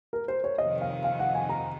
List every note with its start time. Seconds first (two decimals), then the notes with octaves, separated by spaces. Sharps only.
0.13 A#4
0.28 C5
0.44 C#5
0.58 F2 C3 D#3 D#5
0.81 F5
1.04 F5
1.19 F#5
1.35 G#5
1.49 A#5